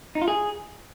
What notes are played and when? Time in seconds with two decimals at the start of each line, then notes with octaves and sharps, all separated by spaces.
0.15 D#4
0.21 F4
0.28 G#4